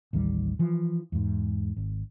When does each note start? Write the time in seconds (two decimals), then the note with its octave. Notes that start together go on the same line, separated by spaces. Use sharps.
0.13 A1 D#2 D#3 G3
0.59 E3 F3
1.12 E2 G#2
1.77 G#1